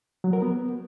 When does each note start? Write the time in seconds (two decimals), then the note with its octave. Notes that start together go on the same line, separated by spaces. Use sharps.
0.24 F#3
0.33 A#4
0.42 B3